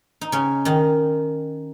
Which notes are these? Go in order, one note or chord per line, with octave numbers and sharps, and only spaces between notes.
D#4
C#3 C#4
D#3 D#4